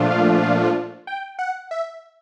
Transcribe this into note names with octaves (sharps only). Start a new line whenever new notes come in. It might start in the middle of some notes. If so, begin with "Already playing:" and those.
Already playing: A#2 F3 A3 D4 F4
F5
F5
G5
F#5
E5